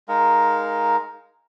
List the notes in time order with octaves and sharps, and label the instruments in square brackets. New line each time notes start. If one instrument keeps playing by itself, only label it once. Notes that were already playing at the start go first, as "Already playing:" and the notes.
[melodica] G#3 D#4 A#4 F5